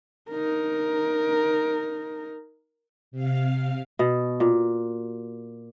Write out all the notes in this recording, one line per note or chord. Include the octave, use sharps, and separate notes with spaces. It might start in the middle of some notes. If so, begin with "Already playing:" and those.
D#4 A#4
C3 F5
B2
A#2